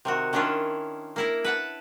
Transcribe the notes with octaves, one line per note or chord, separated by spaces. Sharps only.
C3 D#3 F#4
D#3 C#4 D4 E4 F4
A#3 E4 A#4
B4 F#5 A5